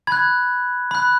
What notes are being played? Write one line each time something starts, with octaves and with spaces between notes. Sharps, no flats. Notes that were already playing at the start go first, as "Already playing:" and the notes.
B5 F#6 G#6
B5 F#6